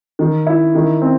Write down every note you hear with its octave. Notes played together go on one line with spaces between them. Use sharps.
D#3
E4
D#3
C4